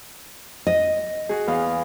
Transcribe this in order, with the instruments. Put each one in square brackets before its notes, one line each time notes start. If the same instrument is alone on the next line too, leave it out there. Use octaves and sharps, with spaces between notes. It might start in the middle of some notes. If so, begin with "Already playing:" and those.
[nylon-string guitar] D#5
[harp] F#4 G#4
E2 F5